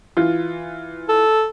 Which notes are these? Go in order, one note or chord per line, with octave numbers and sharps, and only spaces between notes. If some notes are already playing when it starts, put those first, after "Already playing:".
E3 F4
A4